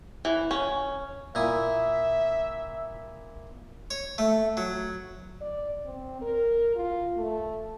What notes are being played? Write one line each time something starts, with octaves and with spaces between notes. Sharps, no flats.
E3
C#4
A#2 E4 E5 D#6
C#5
A3
F#3
D5
C4
A#4
F4
A3